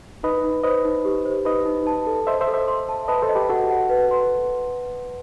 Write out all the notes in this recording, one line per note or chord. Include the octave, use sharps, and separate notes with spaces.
D#4 B4 D#5
D#4
B4 C5 D#5
D#4
G4
C5
D#4 B4 D#5
D#4
A5
A4
C5 D#5 E5
C5 E5
A4
C5 E5
C6
A5
B4 D#5 A5
A4 C5
D#5
G4 B4
F#4 A4 F#5
F#5
B4
C6